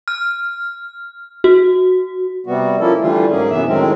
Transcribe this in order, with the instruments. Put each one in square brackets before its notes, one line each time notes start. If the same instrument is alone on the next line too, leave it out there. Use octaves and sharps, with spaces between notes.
[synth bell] F6
F#4
[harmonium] C3 G3 B3 F#4
F3 A#3 C#4 E4 A4
D3 E3 G3 A3 F4
G#2 F#3 A#3 C#4 G#4
F#2 C3 E3 B3 E5
A2 D#3 F#3 G#3 C4 C#4